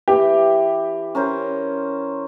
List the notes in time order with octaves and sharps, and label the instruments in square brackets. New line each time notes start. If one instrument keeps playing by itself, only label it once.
[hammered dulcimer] E3 [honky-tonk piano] G4
[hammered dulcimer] C#4 A#4 C5